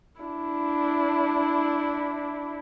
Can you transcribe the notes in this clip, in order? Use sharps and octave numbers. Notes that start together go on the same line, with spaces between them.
D4 E4